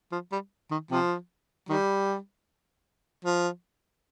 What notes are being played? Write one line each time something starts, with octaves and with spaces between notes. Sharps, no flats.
F3
G3
D#3
C3 F3
D#3 G3
F3